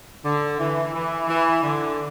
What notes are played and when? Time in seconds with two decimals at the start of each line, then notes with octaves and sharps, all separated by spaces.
0.25 D3
0.58 E3
0.94 E3
1.28 E3
1.63 D3